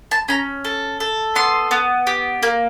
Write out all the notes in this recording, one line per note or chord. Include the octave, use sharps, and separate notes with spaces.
A5
C#4 A#5
A4
A4
B3 C6
B3
G4
A#3